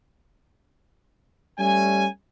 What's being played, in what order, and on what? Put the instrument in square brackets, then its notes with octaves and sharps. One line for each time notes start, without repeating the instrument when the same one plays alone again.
[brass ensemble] G3 A3 C#4 G#5